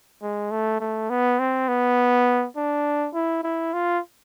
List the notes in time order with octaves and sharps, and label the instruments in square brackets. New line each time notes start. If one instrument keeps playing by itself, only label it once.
[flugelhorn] G#3
A3
A3
B3
C4
B3
D4
E4
E4
F4